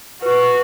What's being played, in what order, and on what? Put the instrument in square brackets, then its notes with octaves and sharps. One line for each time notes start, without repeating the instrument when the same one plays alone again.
[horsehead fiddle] F#4 [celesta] B4